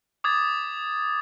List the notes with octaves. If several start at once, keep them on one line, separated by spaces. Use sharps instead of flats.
D6 D#6 G#6 A6